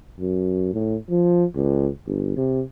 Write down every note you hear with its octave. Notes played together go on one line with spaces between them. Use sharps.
F#2
A2
F3
C#2
G1
C3